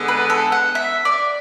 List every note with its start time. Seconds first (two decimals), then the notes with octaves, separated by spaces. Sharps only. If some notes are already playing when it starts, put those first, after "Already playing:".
Already playing: D3 G#3 B3
0.08 B4
0.30 A4
0.52 F#5
0.75 E5
1.05 D5